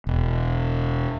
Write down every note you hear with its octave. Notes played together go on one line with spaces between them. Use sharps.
E1